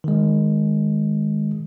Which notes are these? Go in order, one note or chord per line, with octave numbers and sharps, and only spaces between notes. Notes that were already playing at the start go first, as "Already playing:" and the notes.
D#3 G#3